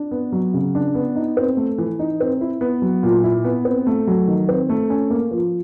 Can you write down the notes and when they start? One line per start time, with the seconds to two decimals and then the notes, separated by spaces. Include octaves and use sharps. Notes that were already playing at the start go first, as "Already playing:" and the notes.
Already playing: D4
0.11 B3
0.32 F#3
0.54 C#3
0.75 D4
0.95 B3
1.16 D#4
1.37 C4
1.57 A3
1.78 E3
1.99 D#4
2.20 C4
2.41 E4
2.61 B3
2.82 F#3
3.03 A#2
3.24 E4
3.44 B3
3.65 C4
3.87 A3
4.07 F#3
4.28 D#3
4.49 C4
4.70 A3
4.90 C#4
5.10 A#3
5.31 F3